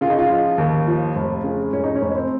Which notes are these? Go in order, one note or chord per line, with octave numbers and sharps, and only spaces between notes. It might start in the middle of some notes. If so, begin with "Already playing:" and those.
C#3 F4
D#4
F4
F3
D#2
F3
F1
C#3
F1 C#4
D#4
C#4
F1
C4